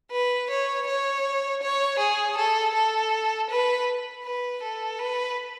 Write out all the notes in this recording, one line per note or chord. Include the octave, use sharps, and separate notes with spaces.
B4
C#5
C#5
C#5
G#4
A4
A4
B4
B4
A4
B4